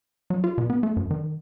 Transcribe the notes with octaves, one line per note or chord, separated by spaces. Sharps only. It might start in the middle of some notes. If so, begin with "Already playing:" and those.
F#3
F4
B2
B3
A3
F#2
D#3